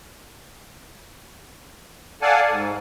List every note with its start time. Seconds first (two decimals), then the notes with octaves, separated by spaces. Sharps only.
2.22 A4 D5 F5 F#5 G#5 A5
2.50 G#2